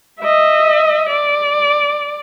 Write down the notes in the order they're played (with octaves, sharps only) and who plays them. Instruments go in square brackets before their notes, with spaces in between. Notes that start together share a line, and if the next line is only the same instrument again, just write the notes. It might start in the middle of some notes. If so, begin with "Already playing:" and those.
[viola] D#5 E5
D5